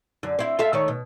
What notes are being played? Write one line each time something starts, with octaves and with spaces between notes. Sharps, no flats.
F#2 D3
C4 E4
F4 A4 E5
D#3 A3 C#5
B2